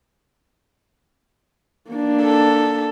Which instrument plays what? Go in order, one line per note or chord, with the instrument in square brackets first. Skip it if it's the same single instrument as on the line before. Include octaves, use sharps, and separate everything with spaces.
[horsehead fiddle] A#3 D4
[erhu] A4